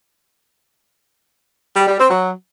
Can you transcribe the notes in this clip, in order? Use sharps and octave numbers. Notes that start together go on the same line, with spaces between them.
G3
G3
C4
F#3